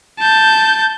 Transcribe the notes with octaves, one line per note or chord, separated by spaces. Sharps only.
A5 G6